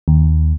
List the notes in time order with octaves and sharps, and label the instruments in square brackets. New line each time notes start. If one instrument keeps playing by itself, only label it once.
[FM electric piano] D#2